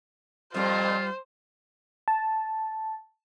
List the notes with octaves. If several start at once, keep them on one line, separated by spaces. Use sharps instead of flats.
F2 A#2 G3 F4 C5
A5